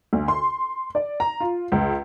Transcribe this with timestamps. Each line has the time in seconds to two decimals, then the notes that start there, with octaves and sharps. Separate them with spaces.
0.13 D2
0.28 C6
0.95 D5
1.20 A#5
1.40 F4
1.72 C#2